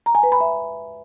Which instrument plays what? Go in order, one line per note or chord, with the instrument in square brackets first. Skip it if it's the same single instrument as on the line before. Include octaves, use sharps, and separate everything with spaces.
[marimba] A#5
G#5
B4
B5
E5